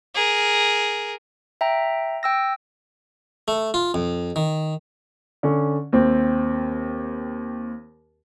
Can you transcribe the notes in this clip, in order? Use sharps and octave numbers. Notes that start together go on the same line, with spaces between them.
G#4 A#4
E5 G5 A#5
G5 E6 A#6
A3
F4
F2
D#3
D3 C#4
D#2 C4